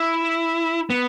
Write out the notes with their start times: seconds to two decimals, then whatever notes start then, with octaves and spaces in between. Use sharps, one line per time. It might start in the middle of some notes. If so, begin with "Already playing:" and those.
Already playing: E4
0.90 B3